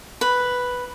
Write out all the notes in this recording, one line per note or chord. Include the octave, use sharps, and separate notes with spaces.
B4